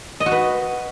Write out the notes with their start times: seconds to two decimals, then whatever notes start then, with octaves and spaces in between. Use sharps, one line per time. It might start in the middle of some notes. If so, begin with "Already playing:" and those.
0.20 D#5
0.26 F#4
0.32 B4